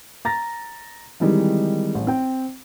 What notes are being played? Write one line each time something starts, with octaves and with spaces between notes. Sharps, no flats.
A#5 A6 A#6
D#3 E3 G3 G#3 C4 D#4
A1
C4 G5